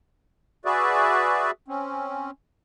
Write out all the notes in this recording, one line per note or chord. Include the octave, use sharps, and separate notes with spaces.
F#4 G#4 B4 D5 E5
C4 C#4